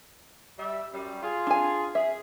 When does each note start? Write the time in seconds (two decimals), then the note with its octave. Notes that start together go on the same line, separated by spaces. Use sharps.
0.59 G3 E5
0.93 F#2 G3
1.23 F4 G#4
1.47 D4 G#5
1.95 G#4 E5